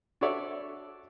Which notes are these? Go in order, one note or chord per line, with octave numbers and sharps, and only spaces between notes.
D4 F#4 A4 C#5 D5 E5